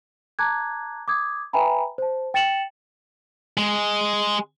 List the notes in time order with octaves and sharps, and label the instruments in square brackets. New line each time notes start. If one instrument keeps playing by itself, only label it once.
[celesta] A5 A#5 D6 F#6 G#6
D6 D#6 G#6
B4 E5 G5 G#5 A#5 B5
C5 A5
G5 A6 C#7 E7 F#7
[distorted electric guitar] G#3